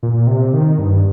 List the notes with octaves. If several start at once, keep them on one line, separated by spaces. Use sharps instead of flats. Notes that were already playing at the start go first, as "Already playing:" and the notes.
A#2
C3
D#3
G2